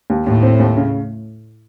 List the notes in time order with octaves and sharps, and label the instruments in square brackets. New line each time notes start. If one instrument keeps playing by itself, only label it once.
[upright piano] D#2
[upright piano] D#2 [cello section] A2
[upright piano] C4
D#2
C#3